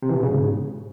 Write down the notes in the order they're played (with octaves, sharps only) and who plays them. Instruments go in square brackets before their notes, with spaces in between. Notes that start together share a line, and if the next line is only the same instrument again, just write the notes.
[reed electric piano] C3
E3
B2
C#3
G#2